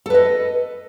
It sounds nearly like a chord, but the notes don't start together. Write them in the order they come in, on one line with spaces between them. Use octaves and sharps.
A4 B4 D#5